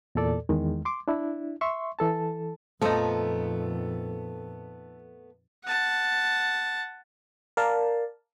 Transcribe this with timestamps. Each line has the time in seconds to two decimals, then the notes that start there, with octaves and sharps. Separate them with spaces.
0.15 E2 A#2 A4 D5
0.49 E2 D#3 G#3
0.85 C6 D6
1.08 D4 E4
1.61 E5 C6 C#6
1.99 E3 A4 A5
2.81 F2 A#2 F3 A3 B3 D#4 A4
5.65 F#5 A5
7.57 A#4 D5 F5 A5